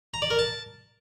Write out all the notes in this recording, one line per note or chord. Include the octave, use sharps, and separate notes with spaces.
A#5
D5
A#4
A5